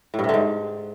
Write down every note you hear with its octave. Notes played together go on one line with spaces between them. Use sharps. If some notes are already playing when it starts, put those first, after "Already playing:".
A2
G2
C3
D3
G#2